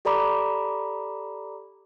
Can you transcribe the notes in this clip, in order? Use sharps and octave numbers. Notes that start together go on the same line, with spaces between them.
G4 A4 D5 A#5 B5 D6